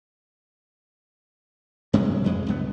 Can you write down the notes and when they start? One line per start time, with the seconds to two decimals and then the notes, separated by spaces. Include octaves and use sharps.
1.93 G2 C3 F#3 G#3
2.24 B1 F2 G#3
2.47 C#2 G2 B3